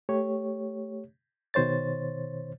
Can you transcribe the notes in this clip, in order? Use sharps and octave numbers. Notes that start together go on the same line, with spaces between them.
A3 G4 C#5
B2 D#3 C5 C#5 A6